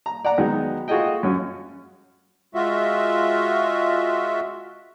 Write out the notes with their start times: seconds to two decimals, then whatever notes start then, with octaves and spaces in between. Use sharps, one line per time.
0.06 A#5
0.25 D5 F#5 A#5
0.38 D#3 F#3 G#3 B3 D#4
0.88 F4 F#4 G#4 A4 D#5 G5
1.23 F#2 C#4 F#4
2.55 G#3 F4 F#4 E5